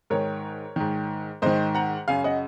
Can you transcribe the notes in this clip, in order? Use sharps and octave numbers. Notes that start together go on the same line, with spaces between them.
G#2 D#3 A#4 C#5
G#2 D#3
G#2 D#3 C5 D#5
F#5 A#5
F#2 C#3 F5 G#5
D#5 F#5